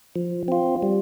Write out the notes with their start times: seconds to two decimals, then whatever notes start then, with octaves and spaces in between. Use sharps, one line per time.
0.16 F3
0.48 C4 F4
0.83 G3